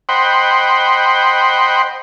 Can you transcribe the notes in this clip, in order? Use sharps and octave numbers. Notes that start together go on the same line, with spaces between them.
C5 D#5 F#5 G5 B5 C6